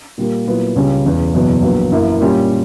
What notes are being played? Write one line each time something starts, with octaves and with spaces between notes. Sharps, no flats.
A#2 G3 A#3
A#2 F#3 B3 E4
C#2 C#3 G3 C#4
E1 E2 C#3
F#1 E2 B2 F#3 B3
A#1 A#2 F#3 B3
F#2 E3 A#3 E4
A#2 G3 C#4